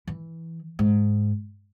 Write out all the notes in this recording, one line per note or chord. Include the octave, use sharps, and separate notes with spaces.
E3
G#2